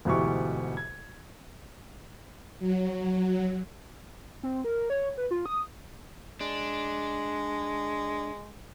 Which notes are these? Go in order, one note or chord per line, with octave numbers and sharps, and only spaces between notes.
D2 G#2 B2 E3 G4 C#6
G#6
F#3
C4
A#4
C#5
B4
F4
D#6
G#3 D4